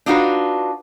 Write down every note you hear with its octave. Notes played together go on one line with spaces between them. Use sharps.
D4 D#4 F4 F#4 B4